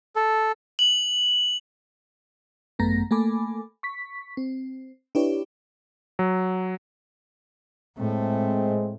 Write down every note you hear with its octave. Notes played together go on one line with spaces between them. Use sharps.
A4
F#7
G#1 F#2 A3 B3 A#5 A#6
A3 A#3 A4 G#5 B5 D6
C#6 B6
C4
D4 E4 G4 B4 C#5 D5
F#3
A2 G#3 A3 C4